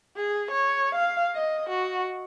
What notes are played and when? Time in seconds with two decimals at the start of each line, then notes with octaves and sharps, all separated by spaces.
0.17 G#4
0.51 C#5
0.95 F5
1.36 D#5
1.70 F#4